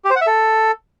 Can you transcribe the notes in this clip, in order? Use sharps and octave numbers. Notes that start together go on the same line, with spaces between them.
G4
C5
F#5
E5
A4